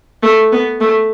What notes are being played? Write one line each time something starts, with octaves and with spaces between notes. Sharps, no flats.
A3
B3
A3